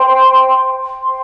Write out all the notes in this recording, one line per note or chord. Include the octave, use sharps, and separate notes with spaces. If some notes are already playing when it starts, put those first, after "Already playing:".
Already playing: C5 G5 C6
C5 G5 C6